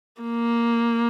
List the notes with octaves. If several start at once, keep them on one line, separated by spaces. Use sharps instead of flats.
A#3